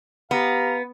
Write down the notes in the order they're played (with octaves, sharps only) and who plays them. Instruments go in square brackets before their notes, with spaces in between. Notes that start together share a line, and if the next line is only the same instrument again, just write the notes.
[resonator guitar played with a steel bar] B3 [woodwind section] G4 F5 A#5